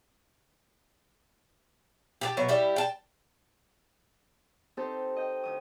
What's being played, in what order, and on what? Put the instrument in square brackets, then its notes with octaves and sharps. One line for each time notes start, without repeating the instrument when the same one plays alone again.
[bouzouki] G4 G#4 A5
B2 F#3 E5
G3 E4 G4
G5 A5
[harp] C4 D#4 G4 A4 C5
D#5 G5
D2 D#6